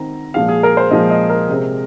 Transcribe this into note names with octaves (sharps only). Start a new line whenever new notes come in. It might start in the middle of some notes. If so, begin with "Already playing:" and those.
Already playing: D#3 C4 A#5
A#2 F3 G#3 F5
G#4
A#4
C5
A#2 F3 G#3 D#5
D#5
A#4
C3 G#3 C4